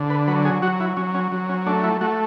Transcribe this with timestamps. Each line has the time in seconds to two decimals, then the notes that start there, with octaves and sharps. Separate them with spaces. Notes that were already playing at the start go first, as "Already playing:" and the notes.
Already playing: D3
0.10 B4
0.27 F#3 B4
0.45 G#4
0.62 F#3 F#4
0.80 E4
0.97 F#3 C#4
1.15 C#4
1.32 F#3
1.49 C#4
1.67 A3 D4
1.84 E4
2.01 A3 F#4